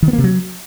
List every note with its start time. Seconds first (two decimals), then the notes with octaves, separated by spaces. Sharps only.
0.02 D#3
0.08 B3
0.13 A#3
0.18 C3
0.24 F#3